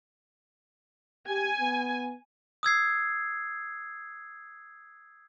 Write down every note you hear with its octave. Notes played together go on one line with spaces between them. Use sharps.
G4 G#5
B3
D#6 E6 G#6 C7